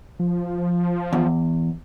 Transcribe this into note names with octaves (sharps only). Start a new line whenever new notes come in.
F3
E2